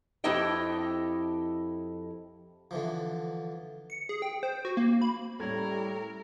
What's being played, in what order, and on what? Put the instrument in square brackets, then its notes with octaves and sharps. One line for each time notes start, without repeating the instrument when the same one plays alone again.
[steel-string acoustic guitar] F2 E4 G4 A4 D#5 G5
[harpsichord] D3 E3 F3
[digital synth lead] C#7
G#4
G5
C5
F#4
A#3
B5
[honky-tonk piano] A2 C#4 G#6 [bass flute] G3 [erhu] A#4